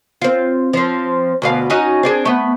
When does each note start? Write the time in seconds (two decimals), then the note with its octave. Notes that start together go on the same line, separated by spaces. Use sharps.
0.22 C4 F4
0.73 F3 C4
1.42 D2 B2 F5
1.70 C#4 D#4 F#4
2.03 C4 D4 G#4
2.25 A3 B3